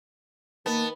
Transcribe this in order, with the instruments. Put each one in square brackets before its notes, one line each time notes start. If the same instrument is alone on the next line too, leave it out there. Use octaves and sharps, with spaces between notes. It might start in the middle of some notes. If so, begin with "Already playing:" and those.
[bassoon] D#3 [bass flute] A#3 [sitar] B3 [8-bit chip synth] A5